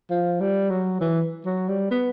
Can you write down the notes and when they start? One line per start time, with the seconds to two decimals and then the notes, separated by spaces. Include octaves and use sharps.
0.10 F3
0.40 G3
0.70 F#3
1.01 E3
1.45 F#3
1.68 G3
1.91 B3